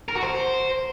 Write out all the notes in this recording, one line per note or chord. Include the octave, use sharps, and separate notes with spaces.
A#4
F#4
C5